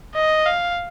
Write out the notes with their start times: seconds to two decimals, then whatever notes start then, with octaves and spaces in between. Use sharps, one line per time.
0.15 D#5
0.46 F5